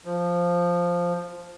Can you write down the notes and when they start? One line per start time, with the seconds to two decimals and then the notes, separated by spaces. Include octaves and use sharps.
0.05 F3